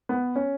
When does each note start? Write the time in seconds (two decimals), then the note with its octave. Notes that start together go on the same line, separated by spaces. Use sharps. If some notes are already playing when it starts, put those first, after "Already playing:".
0.09 B3
0.36 C#4